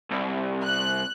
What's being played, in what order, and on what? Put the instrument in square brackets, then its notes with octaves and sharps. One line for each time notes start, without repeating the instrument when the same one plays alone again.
[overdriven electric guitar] C2
[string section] F#6